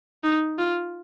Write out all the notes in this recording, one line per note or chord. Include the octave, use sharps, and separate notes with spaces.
D#4
F4